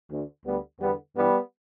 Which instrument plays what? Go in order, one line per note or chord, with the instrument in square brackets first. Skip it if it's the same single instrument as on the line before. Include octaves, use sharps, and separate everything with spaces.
[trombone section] D2 D3
D2 D3 G3 B3
E2 D3 G3 B3
G2 E3 G3 B3